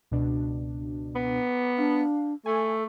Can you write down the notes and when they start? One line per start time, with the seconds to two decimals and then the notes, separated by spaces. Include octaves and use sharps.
0.11 C#2 B2 D4
1.15 B3
1.78 D4 F5
2.46 A3 A4 G#5